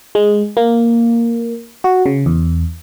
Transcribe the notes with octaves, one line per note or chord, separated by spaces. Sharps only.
G#3
A#3
F#4
C#3
E2